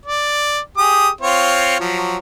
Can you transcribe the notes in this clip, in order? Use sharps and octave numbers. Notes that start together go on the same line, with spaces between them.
D5
G4 G#4 D#6
C4 F4 C#5
F3 F#3